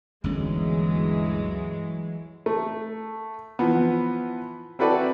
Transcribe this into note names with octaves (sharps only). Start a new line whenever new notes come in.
G1 D2 E3 F#3 G#3 C#4
A3
E3 F3 B3
C4 E4 F#4 A4 B4 D5